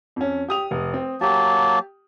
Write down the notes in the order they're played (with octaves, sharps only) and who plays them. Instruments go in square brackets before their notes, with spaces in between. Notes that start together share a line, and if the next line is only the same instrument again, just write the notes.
[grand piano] F2 C#4
G4 D#6 F7
F1
C4
[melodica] F#3 A#3 A5 [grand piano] G4